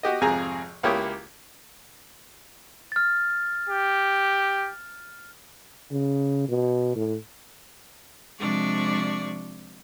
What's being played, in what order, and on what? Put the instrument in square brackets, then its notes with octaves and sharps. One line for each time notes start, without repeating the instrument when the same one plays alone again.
[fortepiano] F#4 G4 D#5
G#1 F2 C3 G#4 G#5 A#5
C#2 A#3 E4 G4 C#5 D#6
[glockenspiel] F6 A6
[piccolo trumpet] G4
[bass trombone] C#3
B2
A2
[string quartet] C3 F3 G#3 D4 D5 C#6